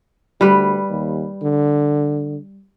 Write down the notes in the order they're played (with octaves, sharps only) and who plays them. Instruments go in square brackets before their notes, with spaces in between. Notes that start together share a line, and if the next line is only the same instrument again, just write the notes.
[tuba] D2 [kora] G3 B4
[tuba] D#2
D3